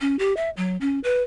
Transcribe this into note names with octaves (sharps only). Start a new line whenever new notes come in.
C#4
G4
E5
F#3
C#4
B4